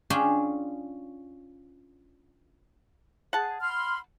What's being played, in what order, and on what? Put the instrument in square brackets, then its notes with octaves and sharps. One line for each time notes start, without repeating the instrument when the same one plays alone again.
[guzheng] C#4 D4 F4 G#4 G5
[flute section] G#4 [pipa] F#5 A5
[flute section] B5 C6 F6